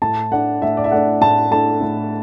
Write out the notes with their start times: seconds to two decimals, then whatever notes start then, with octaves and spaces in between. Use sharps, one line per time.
0.02 A2 A5
0.31 A3 D4 F#5
0.62 A2 E5
0.77 D5
0.84 E5
0.91 A3 D4 F#5
1.21 A2 A5
1.51 A3 D4 A5
1.81 A2